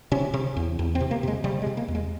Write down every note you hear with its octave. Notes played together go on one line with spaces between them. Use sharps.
C3 C#4
C3
E2
E2
C4
C3
A#3
C3 G#3
C3 G3
G#3
C3
A#3
E2
G#3